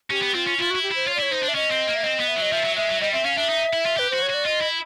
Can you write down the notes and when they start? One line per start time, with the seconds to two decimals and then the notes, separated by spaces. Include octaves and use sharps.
0.10 C#4 G4
0.22 B3
0.34 C4 F4
0.47 C#4
0.59 E4 F4
0.70 E4 F#4
0.83 G4
0.91 E4 C5
1.07 F4 C#5
1.15 D5
1.19 E4 C#5
1.31 D#4 C5
1.43 D4
1.48 E5
1.55 C#4 D#5
1.71 C4
1.88 A#3
1.96 E5
2.03 C4 D#5
2.20 B3
2.28 E5
2.36 F#3
2.42 D#5
2.52 F3 E5
2.64 F#3
2.76 G#3 E5
2.89 F#3
3.01 G3 D#5
3.13 C4 E5
3.25 C#4 F5
3.37 D4 E5
3.49 D#4
3.73 E4
3.86 F4
3.97 G4 B4
4.10 F#4 C5
4.22 C#5
4.30 F#4 D5
4.46 F4 D#5
4.62 E4